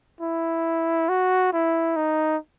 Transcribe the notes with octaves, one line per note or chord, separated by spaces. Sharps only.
E4
F#4
E4
D#4